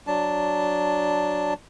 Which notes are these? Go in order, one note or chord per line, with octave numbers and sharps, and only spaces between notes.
F#3 D4 A5